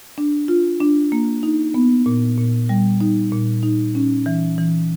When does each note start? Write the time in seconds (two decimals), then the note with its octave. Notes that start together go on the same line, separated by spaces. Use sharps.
0.18 D4
0.48 F4
0.81 D4
1.12 A#3
1.43 D#4
1.74 B3
2.06 A#2
2.37 A#2
2.69 G3
3.01 D#4
3.32 A#2
3.63 D#4
3.95 C#4
4.26 E3
4.58 E3